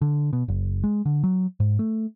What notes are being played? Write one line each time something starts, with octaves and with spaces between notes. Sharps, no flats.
D3
B2
F#1
G#3
D3
F#3
G#2
A3